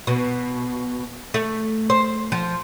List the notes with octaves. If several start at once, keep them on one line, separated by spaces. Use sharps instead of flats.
B2
A3
C5
F3